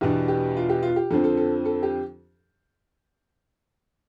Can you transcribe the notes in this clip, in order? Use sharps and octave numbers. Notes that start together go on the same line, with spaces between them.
E2 B2 B3 D4 G4
G4
F4
G4
F4
G4
F2 D3 F3 C4 A4
A4
A4
A4
G4